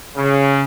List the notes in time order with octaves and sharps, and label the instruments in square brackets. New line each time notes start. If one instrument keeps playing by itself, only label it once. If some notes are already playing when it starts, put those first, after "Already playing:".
[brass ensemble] C#3